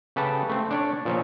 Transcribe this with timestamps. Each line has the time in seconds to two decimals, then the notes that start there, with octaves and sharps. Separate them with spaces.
0.16 C#3 G4 A4 B4 A5
0.49 A3 C4
0.71 D4 C#5 D5
1.05 A#2 F3 C#4 C#5